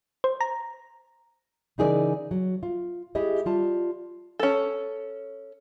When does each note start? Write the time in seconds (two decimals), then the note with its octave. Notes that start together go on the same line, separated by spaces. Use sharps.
0.24 C5
0.41 A#5
1.78 C#3 E3 D#4 G#4 A#4 D5
2.31 F#3
2.63 F4
3.15 G#3 E4 G4 G#4 D#5
3.46 G3 F4 A5
4.39 C#4 A4